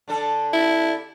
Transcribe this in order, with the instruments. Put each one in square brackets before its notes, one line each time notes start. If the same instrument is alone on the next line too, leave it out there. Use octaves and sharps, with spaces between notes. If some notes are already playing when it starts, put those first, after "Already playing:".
[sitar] D3 D4 A4
[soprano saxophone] E4